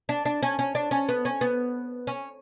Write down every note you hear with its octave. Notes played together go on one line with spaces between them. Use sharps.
D4
D4
C#4
C#4
D4
C#4
B3
C#4
B3
C#4